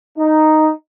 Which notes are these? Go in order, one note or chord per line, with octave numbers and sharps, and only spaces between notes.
D#4